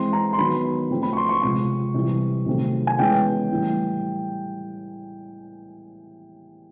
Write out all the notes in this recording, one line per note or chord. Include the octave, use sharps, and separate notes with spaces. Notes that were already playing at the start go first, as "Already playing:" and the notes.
Already playing: E3 G#3 C4 C6
A#5
C6
D#3 F#3 B3 B5
C#3 F3 A3 C4
B5
C#6
C6
C#6
C3 F3 G#3 C4 C#6
C3 E3 G3
C3 D#3 F#3 A3 C4
G#5
C#3 E3 G#3 B3 G5
A2 E3 G3